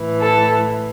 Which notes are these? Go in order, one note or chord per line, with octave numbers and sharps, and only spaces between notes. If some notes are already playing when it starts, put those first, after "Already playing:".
Already playing: A2 E3
A4